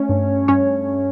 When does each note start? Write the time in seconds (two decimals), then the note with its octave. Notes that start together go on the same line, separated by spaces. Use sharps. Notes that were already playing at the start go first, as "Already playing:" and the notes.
Already playing: A3 C#4 C#5
0.09 G2
0.48 G2 C#4 C#5